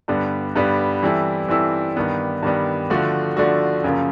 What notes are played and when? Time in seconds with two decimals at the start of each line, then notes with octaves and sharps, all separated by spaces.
0.08 G2 D3 G3 B3
0.56 G2 D3 G3 B3
1.02 E3 G3 C4 E4 A4
1.48 E3 G3 C4 E4 A4
1.96 G2 D#3 G3 B3 D4
2.43 G2 D#3 G3 B3 D4
2.90 D3 F3 A3 D4 F#4
3.37 D3 F3 A3 D4 F#4
3.84 F#2 C#3 F3 A#3